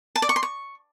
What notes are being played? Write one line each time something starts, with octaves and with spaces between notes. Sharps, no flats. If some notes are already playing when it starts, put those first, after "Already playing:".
A5
D5
C#6
C6
C#6